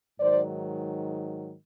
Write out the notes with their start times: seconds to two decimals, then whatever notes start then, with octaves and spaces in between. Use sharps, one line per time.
0.20 G#2 D#3 F#3 C5 D5